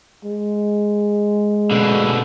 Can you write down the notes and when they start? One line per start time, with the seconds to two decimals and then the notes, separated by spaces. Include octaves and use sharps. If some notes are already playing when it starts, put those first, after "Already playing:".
0.24 G#3
1.71 B2 D3